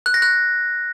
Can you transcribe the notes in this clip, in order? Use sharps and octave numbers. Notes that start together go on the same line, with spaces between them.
F#6
A#6
F#6